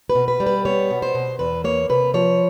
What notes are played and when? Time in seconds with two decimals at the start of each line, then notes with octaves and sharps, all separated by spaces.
0.10 B4
0.15 B2
0.28 B4
0.40 G3
0.47 B4
0.65 B3 C#5
0.91 B2
1.02 C5
1.15 B2
1.39 E2 B4
1.64 A#3 C#5
1.89 C3 B4
2.14 F3 C#5